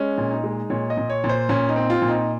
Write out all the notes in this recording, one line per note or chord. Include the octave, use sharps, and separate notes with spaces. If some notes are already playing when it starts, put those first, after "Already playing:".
Already playing: G#3 C#4
A#2
D#4
G#3
A#2 C#5
D#5
A#2
C#5
A#2
C5
A#2 C#4
D#4
C4
F4
A#2
D#4